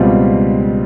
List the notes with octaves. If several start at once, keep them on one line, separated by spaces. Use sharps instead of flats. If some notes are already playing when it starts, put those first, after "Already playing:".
Already playing: C#2 B2 G3 C4 F4